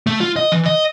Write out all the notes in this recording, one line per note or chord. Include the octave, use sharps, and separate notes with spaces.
A3
F4
D#5
E3
D#5